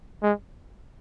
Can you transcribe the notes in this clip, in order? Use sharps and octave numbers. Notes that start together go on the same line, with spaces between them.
G#3